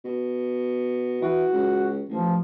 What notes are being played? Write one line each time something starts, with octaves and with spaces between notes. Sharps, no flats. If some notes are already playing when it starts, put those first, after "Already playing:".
B2
E3 F#4
C#2
A1 F3